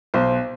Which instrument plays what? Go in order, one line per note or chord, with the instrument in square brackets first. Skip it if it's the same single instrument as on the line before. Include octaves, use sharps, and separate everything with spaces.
[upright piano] B1 C5